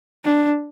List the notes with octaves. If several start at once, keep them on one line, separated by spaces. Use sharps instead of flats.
D4